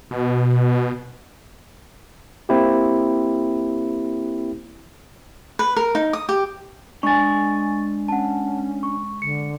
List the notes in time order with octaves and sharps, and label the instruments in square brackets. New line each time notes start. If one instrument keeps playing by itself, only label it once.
[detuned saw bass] B2
[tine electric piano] A#3 C4 E4 G4
[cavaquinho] B4
A#4
D#4
D#6
G4
[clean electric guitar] G#3 G#5 [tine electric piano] D4 [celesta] C#6 A6
[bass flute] C#4 [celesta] F#5 A5
[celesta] C#6
[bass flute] D3 [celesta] C#7